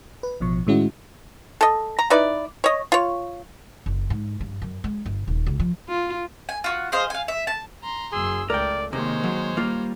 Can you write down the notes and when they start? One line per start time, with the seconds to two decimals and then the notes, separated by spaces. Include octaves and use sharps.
0.23 B4
0.40 A1 B2 F3 C#6
0.67 A2 D#3 G#3 C#4 E4 F#4
1.61 A4 D#5
1.99 A#5
2.10 D#4 E4 B4 D5
2.64 C#5 D#5
2.92 F4 C#5
3.86 F#1
4.10 G#2
4.41 G2
4.62 F#2
4.84 G#3
5.06 G1
5.28 D#1
5.46 C#2
5.60 F3
5.89 F4
6.49 G#5
6.64 F4 F#4
6.92 G#4 C5 D#5 F5
7.10 F5 G#5
7.28 E5
7.47 A5
7.83 A#5 C6
8.12 F#1 F#2 G#4 C6 E6
8.50 C#2 A3 A#4 D5 G5
8.93 C3 D#3 G#3 A#3 C5 C#5
9.24 F#3
9.57 G3 A#3 F4